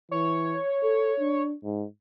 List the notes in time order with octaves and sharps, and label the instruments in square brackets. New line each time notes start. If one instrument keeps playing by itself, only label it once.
[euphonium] E3 [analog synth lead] C#5
[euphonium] A4
D4
G#2